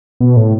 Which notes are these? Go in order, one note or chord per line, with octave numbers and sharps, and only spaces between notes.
B2
A2